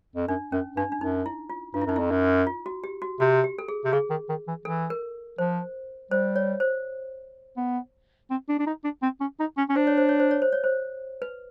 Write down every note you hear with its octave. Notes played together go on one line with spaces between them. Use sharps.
F2
F#2 D4
F#2 C#4
G2 D4
D4
F#2 D#4
E4
F4
G2 F4
E4
F#2 D#4
F2 E4
F#2
F4
F#4
G4
F#4
C3 F#4
G4
A4
G#4
C3
C#3 G#4
D#3
D#3
E3
E3 A4
A#4
F3 C5
G3 C5
C#5
C5
B3
C4
D4
D4
D#4
D4
C4
C#4
D#4
C#4
C#4
D4 C5
C#5
C5
C#5
C5
C#5
C5
C#5
C5
B4